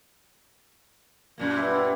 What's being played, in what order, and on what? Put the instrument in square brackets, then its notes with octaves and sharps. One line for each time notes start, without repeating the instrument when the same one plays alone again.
[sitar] F#2 A#2 A#3
[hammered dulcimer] G3 B3 E4
E4